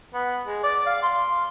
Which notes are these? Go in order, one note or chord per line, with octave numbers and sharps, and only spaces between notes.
B3
G#3
D5
F5
C6